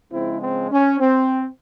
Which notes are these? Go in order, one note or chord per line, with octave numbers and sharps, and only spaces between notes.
C#3 F3 G#3 C4 E4
C4
C#4
C4